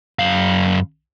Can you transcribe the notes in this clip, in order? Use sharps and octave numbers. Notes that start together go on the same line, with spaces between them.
F#2 F5